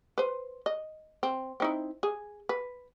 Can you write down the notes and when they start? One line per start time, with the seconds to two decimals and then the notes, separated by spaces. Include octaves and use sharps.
0.18 B4 C5
0.66 D#5
1.23 C4
1.60 C4 D#4 E4
2.03 G#4
2.49 B4